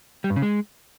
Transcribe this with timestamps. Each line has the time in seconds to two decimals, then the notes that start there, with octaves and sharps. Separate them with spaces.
0.24 G3
0.30 G2
0.36 C#3
0.42 G#3